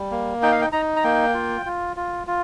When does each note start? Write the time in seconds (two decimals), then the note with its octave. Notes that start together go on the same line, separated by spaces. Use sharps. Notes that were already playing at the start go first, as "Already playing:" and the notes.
Already playing: G3
0.11 A#3
0.42 D#4 G5
0.52 F5
0.61 G5
0.72 D#4 A#5
0.96 A#5
1.04 A#3 G5
1.34 F4
1.66 F4
1.96 F4
2.27 F4